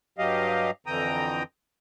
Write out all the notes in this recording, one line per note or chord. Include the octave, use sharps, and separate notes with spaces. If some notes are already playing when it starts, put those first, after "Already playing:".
G2 F#3 G4 D#5 F5
F2 D3 E3 G5 A#5 D#6